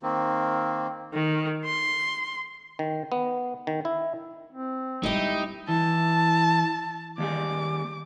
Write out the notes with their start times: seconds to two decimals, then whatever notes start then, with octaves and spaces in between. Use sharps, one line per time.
0.03 D#3 A#3 C4
1.13 D#3
1.65 C6
2.79 D#3
3.12 B3
3.67 D#3
3.85 E4
4.53 C4
5.03 G3 G#3 D#4 E4 G4
5.69 E3 A5
7.18 D#2 G3 G#4 D6